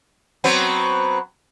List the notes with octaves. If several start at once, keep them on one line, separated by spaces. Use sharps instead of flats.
F#3 B3 C4